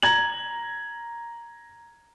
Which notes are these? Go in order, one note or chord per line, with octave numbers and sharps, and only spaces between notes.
A#5 G#6 F#7